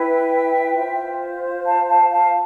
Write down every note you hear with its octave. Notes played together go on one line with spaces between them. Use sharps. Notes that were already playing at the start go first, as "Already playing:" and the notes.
Already playing: E4 B4 E5 G5
F4 C5
F5 A5
F5 A5
F5 A5